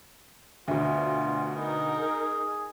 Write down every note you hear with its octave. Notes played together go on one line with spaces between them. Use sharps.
D2 B2 F4 E5
B3 D#4 A#4
G#4